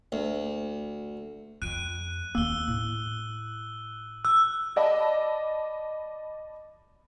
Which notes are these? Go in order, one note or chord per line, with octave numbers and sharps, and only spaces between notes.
D2
F2 C4 F#6 D7 D#7
D#2 A#3 C4 E6 G7
A2
E6 F#6
D5 D#5 A5 B5